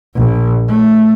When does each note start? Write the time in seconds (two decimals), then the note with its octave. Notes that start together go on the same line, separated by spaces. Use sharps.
0.15 A#1
0.68 A3